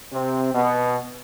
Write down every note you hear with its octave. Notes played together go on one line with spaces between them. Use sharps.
C3 C4
B2 B3